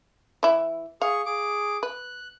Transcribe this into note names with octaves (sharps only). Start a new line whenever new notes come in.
E3 E4
G#4 F5 C#6
G#4 D6
B4 F#6